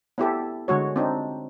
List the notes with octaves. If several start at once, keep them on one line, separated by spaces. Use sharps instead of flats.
B3 E4 G4 A4
D3 G#3 F#4 C#5
C4 D4 D#4